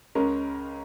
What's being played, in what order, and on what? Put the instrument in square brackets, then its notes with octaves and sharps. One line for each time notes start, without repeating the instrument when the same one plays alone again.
[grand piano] C#2 C#3 G#3 C#4 A#4